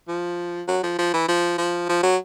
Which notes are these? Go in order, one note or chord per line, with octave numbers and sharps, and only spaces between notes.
F3
F#3
F3
F3
E3
F3
F3
F3
F#3